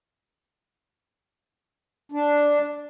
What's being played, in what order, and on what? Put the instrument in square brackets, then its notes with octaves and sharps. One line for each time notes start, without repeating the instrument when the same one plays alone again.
[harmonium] D4